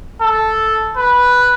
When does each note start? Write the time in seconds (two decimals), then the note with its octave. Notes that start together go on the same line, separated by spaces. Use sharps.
0.21 A4
0.96 B4